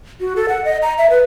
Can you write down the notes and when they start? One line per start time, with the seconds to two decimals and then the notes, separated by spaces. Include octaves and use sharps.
0.20 F#4
0.36 A4
0.49 F#5
0.65 D#5
0.82 A#5
0.98 E5
1.10 B4